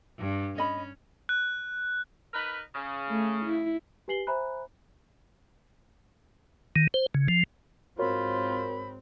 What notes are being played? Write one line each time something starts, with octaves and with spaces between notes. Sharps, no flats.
G2
C#4 D#5 B5
F#6
D#4 A#4 B4
C#3
A3
E4
G4 B4 G#5 C7 F#7 G7
C5 E5 G#5 A#5 B5 F#6
D#3
C5
C#3
F3
G#2 C4 F4 F#4 A#4 C#5 B5